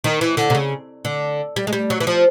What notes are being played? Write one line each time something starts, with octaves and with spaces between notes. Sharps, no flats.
D#3
E3
D3
C3
C#3
D3
G3
G#3
G3
F#3
E3
F3